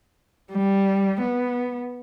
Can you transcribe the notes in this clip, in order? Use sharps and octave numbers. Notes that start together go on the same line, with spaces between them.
G3
B3